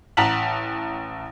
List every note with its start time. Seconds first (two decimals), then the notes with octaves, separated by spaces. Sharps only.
0.17 A1 F#5 A5 A#5 B6 F#7